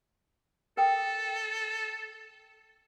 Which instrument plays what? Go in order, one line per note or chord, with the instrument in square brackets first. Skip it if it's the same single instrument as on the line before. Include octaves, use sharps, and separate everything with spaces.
[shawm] A4 [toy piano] A#4 G5 D#6